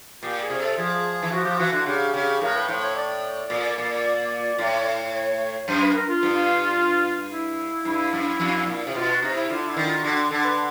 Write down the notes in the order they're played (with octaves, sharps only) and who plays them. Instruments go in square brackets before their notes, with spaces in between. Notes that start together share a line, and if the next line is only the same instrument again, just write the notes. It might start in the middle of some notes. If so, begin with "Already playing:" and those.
[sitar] A#2 [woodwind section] G4
[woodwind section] G#4
[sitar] C3
[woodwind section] A4
[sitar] F3 [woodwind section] G#4
[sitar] E3
[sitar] F3 [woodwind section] F#4
[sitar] F3 [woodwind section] G4
[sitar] E3 [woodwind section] F#4
[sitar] D3
[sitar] C#3 [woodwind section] G4
[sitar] C#3
[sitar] A2 [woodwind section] A#4
[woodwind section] B4
[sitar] A2 [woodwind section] C5
[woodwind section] C#5
D5
[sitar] A#2
A#2
A2
[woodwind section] C#5
[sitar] F#2 [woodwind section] C5
[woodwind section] B4
A#4
F4
[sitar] G2
[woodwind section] E4
[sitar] G2 [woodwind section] E4
[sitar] F#2
F2
A#2
C3
[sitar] B2 [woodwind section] F4
[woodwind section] F#4
[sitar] C3 [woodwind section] D#4
[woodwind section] E4
[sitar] D3 [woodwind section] F4
[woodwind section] E4
[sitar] D#3
[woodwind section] F4
[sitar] D3 [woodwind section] F#4
[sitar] D3 [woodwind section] A4
[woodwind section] B4